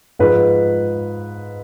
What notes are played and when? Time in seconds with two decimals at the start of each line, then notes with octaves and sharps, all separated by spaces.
0.19 G#2 F3 G#3 B4